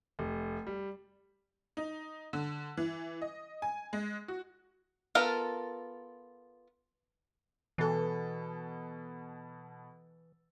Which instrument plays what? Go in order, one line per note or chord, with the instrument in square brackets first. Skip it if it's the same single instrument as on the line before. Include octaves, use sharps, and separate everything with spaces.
[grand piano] F1
G3
[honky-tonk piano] D#4
D3
E3
D#5
G#5
G#3
F#4
[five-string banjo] B3 F4 A4 A#4
[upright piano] B2 A4 [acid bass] E3